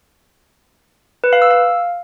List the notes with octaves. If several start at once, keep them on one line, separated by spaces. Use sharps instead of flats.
B4
F5
E6
F5